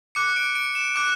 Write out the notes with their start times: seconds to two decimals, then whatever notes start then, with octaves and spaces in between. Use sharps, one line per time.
0.15 D6 F#6 C#7
0.36 D7
0.55 D7
0.75 E7
0.96 D6 F#6 E7